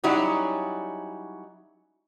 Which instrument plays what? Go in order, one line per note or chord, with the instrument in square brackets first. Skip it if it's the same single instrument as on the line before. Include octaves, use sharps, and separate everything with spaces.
[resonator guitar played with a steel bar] F#3 G3 C#4 D#4 E4 F#4